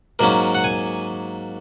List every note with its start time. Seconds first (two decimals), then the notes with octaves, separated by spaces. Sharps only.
0.19 G#2 F#3 A#3 C#4 A#4
0.55 F#5
0.64 G#5